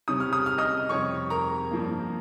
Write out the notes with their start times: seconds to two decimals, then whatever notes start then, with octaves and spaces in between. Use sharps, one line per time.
0.08 C3 G3 C#4 D#6
0.20 F6
0.33 D#6
0.46 F6
0.58 D#5 D#6
0.89 F2 C3 G3 C#5 C#6
1.30 A#4 A#5
1.71 G2 F3 A#3